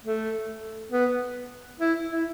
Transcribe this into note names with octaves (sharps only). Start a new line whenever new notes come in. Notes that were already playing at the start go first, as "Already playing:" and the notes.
A3
B3
E4
E4